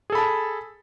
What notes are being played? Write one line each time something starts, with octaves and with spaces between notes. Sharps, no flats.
G#4 A4 A5 B5